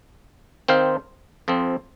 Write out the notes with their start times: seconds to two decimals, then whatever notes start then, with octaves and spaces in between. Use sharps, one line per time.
0.68 D#3 C4 D#4 C5 F5
1.48 F2 F3 C4